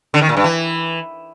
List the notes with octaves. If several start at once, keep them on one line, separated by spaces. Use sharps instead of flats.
D3
D#3
A#2
G2
E3